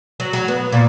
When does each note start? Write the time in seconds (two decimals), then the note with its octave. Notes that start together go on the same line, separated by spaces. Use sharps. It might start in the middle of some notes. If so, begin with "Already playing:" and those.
0.20 F#3
0.33 F#3
0.48 B3
0.72 A#2